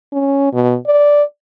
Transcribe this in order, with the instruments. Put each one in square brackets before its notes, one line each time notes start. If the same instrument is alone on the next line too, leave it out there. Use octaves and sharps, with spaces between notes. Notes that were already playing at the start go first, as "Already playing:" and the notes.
[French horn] C#4
B2
D5